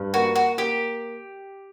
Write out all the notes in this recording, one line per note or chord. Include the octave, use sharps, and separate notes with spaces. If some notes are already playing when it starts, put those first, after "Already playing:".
Already playing: G2
A#3 F#4
F#4
A#3 G4